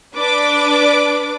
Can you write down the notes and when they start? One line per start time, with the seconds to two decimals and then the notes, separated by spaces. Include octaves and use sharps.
0.16 D4 B4 D5 D6